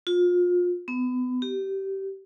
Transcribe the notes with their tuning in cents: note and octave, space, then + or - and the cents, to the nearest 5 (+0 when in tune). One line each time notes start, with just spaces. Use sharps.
F4 +30
B3 +30
G4 -20